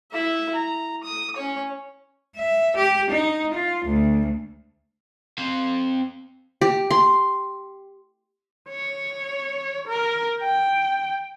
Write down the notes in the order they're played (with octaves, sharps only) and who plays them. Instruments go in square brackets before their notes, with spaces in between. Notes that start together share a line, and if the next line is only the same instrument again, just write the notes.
[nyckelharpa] E4 E5
A#5
D#6
C#4 C#5
[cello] E5
G4
D#4
F4
D2
[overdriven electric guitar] C4 F5
[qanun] G4
C6
[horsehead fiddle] C#5
A#4
G5